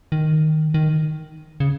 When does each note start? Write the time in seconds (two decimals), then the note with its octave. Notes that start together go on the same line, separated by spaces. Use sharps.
0.12 D#3
0.74 D#3
1.60 C#3